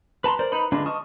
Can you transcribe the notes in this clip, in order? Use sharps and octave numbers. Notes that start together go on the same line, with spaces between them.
B4 A5 A#5 C6
A#4 C5 D5
D#4 B4 B5
D3 G#3 D4 F4 B4
D#5 A5 C#6 D#6 F6